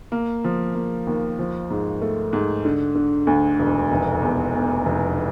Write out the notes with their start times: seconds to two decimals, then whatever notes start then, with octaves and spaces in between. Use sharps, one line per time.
0.12 A#3
0.44 F3
0.75 A#3
1.07 D#2
1.39 F3
1.70 G#2
2.02 A3
2.33 G#2
2.65 D3
2.95 D3
3.27 D2
3.59 E1
3.91 F1
4.22 E2
4.53 B2
4.86 F1